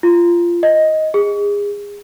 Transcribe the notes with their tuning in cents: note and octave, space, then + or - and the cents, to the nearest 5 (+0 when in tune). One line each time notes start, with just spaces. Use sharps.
F4 -15
D#5 +5
G#4 -30